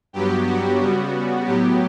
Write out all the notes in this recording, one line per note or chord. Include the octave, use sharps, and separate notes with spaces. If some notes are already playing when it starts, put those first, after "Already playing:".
G2 F#3 B3 G4
F#4
C#3 G3 B3
A2 F#3 B3 G4